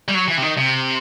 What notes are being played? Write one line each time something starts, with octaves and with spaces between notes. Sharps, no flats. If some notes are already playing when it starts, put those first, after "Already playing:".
G3
F#3
E3
C3
D#3
C3